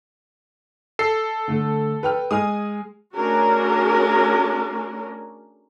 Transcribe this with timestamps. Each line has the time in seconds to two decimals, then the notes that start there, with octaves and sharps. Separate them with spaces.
0.99 A4 C7
1.48 D3 A3
2.03 B4 G5 F6
2.31 G#3 G#5 D#6 F6
3.15 A3 C#4 D4 F#4 G#4 A#4